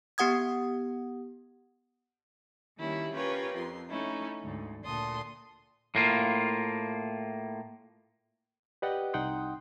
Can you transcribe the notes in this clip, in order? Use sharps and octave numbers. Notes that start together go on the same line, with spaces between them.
B3 G4 F#5 D#6 G#6
D#3 G3 A#3 C#4 E4
C#4 F4 G4 A#4 B4 C#5
F2 C6
A3 C#4 D#4 E4
D2 G#2
D2 A#2 A5 C6 D#6
A2 A#3 F4
G4 B4 D5 D#5 F#5 G5
C2 D#4 F#5 G5 C6 D#6